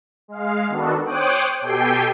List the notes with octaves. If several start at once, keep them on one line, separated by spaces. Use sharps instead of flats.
G#3 F5
D#3 B3 D4 F#4 A4
C5 C#5 G5 D6 D#6 F#6
B2 G4 A4 G5 G#5 C7